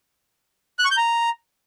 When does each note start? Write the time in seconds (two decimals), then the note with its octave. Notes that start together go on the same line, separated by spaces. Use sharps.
0.79 F#6
0.85 C#6
0.91 G6
0.97 A#5